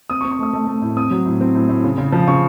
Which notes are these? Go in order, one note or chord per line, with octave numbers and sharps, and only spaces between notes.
C4 D#6
C#6
C4
C#6
A3 D#6
A3
A3
A2
C4 D#6
F#3
A2
C4
A2
A2
C#3
C#3
F3
C#3 C#6